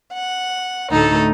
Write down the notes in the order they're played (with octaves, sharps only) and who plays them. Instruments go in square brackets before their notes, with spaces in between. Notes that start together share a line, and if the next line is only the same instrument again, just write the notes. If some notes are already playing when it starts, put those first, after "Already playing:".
[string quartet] F#5
D2 A2 D#4 A4